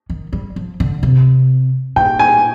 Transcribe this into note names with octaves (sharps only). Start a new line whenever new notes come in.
D#3
G3
F3
D3
C3
A#2 G5
G#5